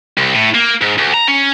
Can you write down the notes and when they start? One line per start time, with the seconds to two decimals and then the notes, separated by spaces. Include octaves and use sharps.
0.18 C2
0.35 A2
0.55 A#3
0.82 G#2
0.98 D2
1.14 A#5
1.28 C#4